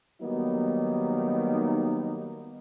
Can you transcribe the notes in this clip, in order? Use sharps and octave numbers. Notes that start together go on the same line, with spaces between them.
D#3 F#3 G3 A#3 B3 D#4